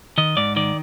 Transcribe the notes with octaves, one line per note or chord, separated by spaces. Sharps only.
D#3 D#5
G#2 D5
D#3 D5